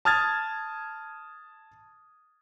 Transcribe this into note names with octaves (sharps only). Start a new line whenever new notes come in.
A5 D#6 F6 G#6 A6